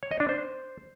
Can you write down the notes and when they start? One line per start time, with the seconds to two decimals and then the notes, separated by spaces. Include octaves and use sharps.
0.03 C#5
0.11 D#5
0.20 D4
0.29 C5